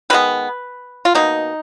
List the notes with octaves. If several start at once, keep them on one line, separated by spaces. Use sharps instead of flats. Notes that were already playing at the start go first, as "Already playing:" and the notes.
D#3 G#3 B3 B4
F4
B2 A#3 D#4